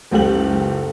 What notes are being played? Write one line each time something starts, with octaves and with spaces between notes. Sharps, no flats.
F#1 C#2 G4 A4 F#7